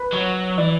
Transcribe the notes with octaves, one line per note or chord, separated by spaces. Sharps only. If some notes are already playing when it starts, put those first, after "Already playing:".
Already playing: B4
F#3 C#5
E3 D5